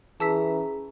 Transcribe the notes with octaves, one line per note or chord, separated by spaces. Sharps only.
E3 C#4 G#4 A5 A#5 E6 B6